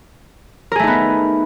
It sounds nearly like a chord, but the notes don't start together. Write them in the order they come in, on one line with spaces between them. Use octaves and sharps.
A#4 G#4 A3 D#4 B3